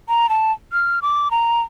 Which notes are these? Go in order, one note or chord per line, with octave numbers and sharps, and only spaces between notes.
A#5
A5
F6
D6
A#5